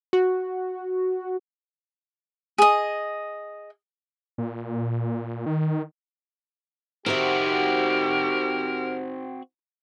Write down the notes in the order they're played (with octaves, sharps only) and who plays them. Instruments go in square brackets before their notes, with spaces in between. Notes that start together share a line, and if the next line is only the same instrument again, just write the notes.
[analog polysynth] F#4
[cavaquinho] G#4 D#5
[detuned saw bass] A#2
D#3
[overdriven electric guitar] C4 F#4 [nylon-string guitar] D#4 C5 E5 [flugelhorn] G4 [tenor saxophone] A#4